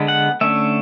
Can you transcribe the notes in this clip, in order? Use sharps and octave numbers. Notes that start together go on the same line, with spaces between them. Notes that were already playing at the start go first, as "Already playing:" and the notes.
Already playing: D3 G#3 B3
F#5
D3 A3 C#4 E5